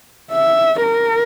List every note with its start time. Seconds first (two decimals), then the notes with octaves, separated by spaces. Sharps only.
0.31 E5
0.82 A#4